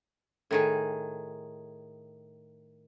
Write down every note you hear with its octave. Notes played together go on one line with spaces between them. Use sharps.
A2 D#3 G#4